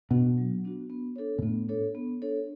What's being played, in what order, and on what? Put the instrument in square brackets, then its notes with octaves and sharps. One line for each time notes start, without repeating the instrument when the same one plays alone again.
[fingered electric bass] B2 [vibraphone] B3 D4 F#4
[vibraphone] F#3
B3 D4 F#4
B3
D4 A4 C#5
[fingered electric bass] B2
[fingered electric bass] A2 [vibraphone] B3
[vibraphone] D4 A4 C#5
B3
D4 A4 C#5